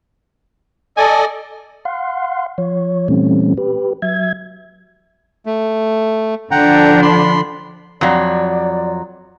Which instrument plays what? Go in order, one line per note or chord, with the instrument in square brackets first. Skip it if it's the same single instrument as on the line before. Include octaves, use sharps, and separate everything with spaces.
[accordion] A4 D5 D#5 [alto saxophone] G#5
[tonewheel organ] F5 F#5 C6
F3 C#5
A#2 E3 G3 A3 C4 C#4
G4 B4
F#3 E5 G#6
[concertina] A3
[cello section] D3 F3 D4 [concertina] F#5 G5 A#5
[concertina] B5 C6
[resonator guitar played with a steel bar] F2 F#3 [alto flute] D5